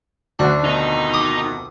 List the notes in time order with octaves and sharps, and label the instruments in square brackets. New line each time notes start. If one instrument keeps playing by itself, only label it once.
[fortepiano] D2 F#4 [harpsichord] D4
[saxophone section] F2 B2 D#3 [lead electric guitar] D#4 D#5
[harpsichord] D6 D#6